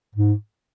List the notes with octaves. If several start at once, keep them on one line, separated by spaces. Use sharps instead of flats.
G#2